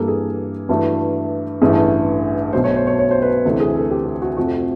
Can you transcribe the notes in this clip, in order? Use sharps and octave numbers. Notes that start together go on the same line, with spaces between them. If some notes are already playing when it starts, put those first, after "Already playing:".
Already playing: G2 E3 G3 A#3 A4
G#4
G2 E3 A3 F#4
A1 G2 E3 A3 G#4
B1 B2 F#3 A3 C5
C#5
C5
C#5
C#5
C5
B4
D2 C3 E3
G#4
A4
G4
G4
F#4
F2 C3 F3 A3 F#4